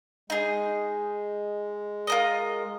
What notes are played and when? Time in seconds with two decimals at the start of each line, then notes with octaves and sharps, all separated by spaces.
0.30 G#3 D#4 G#4
2.07 F4 A#4 D#5